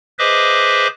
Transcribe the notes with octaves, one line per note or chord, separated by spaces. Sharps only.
G#4 B4 C5 D#5 E5 D6